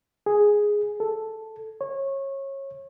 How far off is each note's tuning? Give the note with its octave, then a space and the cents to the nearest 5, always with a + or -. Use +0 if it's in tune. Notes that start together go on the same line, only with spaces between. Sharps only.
G#4 +0
A4 +0
C#5 -25